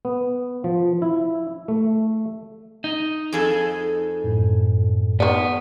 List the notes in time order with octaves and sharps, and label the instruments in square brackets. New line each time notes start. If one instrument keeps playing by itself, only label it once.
[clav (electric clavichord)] B3
F3
E4
A3
[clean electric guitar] D#4
[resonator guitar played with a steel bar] F2 G#4 A4
[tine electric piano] F#2 A2
[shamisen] D#3 D5 [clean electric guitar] B3